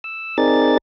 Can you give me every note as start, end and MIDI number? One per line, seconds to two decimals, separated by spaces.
0.04 0.37 88
0.38 0.78 60
0.38 0.78 63
0.38 0.78 68
0.38 0.78 70
0.38 0.78 74
0.38 0.78 93